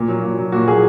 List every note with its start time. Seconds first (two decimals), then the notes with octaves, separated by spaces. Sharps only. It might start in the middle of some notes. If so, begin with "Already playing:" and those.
Already playing: A#2
0.08 F#3
0.23 A#2
0.38 F#3
0.52 A#2 F#4
0.67 F#3 G#4